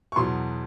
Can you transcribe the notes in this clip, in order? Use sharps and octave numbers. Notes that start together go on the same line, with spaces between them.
C#6
E2 B2 F#3 C6